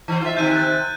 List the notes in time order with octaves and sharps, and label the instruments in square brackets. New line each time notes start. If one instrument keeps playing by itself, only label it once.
[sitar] E3 C5
F4 E5
[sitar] C3 D#3 C4 [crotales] G6 D#7
[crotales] F#6 A6